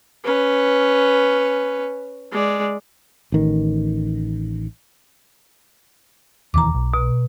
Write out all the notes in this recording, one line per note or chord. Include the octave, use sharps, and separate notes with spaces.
C#4 B4
G#3 D5
A1 D#3
E1 D#2 E3 A#5 D6
B1
B2